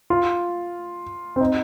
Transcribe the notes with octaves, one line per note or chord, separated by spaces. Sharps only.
F4
C4
D#4